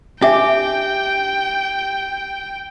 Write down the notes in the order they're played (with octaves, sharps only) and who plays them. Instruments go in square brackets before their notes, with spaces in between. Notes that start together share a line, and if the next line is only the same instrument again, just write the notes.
[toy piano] D4 E5 [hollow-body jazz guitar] G4 [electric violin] G5